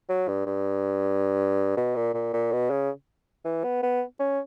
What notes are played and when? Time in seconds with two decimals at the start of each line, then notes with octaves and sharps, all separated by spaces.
0.09 F#3
0.28 G2
0.46 G2
1.77 B2
1.96 A#2
2.14 A#2
2.33 A#2
2.52 B2
2.70 C#3
3.45 E3
3.64 B3
3.83 B3
4.20 C#4